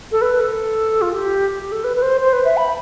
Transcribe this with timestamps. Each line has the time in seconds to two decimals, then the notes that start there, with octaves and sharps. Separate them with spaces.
0.12 A4
0.22 B4
0.40 A4
1.02 F4
1.13 G4
1.60 G4
1.72 A4
1.84 B4
1.97 B4
2.02 C5
2.21 C5
2.33 B4
2.45 E5
2.57 B5